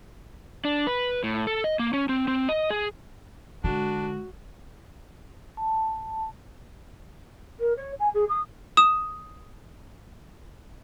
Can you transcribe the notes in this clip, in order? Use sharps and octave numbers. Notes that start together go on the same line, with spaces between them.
D4
B4
A2
A4
D#5
A#3
C#4
C4
C4
D#5
G#4
D3 G#3 D4 F#4
A5
A#4
C#5
G#5
G#4
D#6
D#6 E7